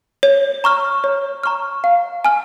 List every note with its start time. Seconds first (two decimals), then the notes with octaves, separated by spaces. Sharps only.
0.23 C#5
0.64 A#5 C#6 F6
1.04 C#5
1.43 A#5 C#6 F6
1.84 F5
2.25 G#5 F6